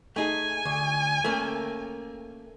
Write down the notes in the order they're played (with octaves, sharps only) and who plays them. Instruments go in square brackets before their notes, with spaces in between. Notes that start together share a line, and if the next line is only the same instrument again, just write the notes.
[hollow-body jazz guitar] A3 D#4 G#4 [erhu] G#5
[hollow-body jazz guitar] D2
A3 A#3 C#4